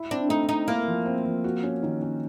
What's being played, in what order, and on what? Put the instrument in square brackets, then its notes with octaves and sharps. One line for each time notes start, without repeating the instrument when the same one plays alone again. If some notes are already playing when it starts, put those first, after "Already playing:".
Already playing: [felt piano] E4
[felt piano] C4 [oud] D4
[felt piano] A3 [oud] D#4
[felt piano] C4 [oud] D#4
[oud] A#3 [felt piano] E4
[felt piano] F3
C4
F3
F#4
C#4
D#3
C#4